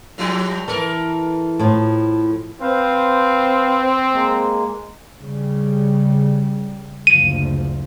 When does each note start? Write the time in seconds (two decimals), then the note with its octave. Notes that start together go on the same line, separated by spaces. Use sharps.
0.18 A2 F3 G3
0.68 E3 A4 A#4
1.59 A2 F3
2.61 C4 B4 C5 F5
4.12 G#3 A#3
5.20 C#3 G3
7.07 F#1 D2 F3 D#7